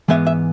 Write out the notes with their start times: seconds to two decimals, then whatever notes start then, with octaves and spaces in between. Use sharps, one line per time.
0.08 G#2 E3 G#3 B3 E5
0.27 E5